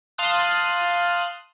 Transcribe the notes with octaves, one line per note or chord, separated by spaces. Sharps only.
F5 A5 C6 D#6 F#6